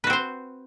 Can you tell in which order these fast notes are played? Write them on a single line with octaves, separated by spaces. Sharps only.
B4 F#4 C4 C5